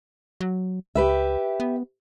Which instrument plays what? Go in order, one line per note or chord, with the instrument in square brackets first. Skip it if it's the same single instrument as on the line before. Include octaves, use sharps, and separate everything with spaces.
[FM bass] F#3
[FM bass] C#2 [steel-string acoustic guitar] G4 B4 E5
[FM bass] B3